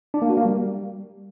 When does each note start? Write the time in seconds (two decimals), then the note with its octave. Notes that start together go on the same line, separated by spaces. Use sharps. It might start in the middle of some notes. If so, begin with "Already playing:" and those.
0.14 D4
0.22 A#3
0.30 F#4
0.37 A#3
0.45 G3